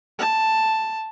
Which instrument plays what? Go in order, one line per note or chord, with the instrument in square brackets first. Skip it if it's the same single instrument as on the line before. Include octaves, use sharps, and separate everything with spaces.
[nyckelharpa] A5